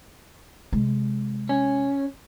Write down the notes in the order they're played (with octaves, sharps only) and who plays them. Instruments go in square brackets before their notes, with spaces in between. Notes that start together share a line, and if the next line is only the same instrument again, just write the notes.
[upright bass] C3 G#3
[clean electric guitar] C#4